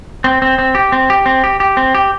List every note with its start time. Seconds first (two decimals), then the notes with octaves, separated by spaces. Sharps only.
0.24 C4
0.42 C4
0.58 C4
0.75 G4
0.92 C4
1.10 G4
1.26 C4
1.44 G4
1.60 G4
1.77 C4
1.95 G4